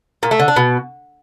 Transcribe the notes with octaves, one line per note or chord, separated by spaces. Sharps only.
A#2
A3
D3
D4
B2